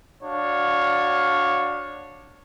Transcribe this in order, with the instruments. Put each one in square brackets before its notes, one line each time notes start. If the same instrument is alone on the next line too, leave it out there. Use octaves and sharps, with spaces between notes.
[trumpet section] D4 F#4 C#5 D5 F5